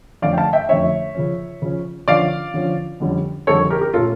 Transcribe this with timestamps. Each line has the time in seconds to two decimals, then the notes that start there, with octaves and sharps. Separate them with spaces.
0.22 F2 D3 A3 C#4 D5 F5
0.33 G5
0.38 F5 A5
0.53 E5 G5
0.69 F2 D3 A3 C#4 C#5 E5
1.15 C#3 F3 C#4
1.62 C#3 F3 C#4
2.08 D3 F3 C#4 D5 F5
2.54 D3 F3 C#4
3.00 F2 D3 G3 C#4
3.47 F2 D3 G3 C#4 A4 C#5
3.70 G4 A#4
3.81 G4 A#4
3.94 A#2 A3 C#4 F4 A4